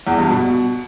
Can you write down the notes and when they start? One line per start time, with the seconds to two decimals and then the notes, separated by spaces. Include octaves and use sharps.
0.07 E2
0.18 G2
0.30 B2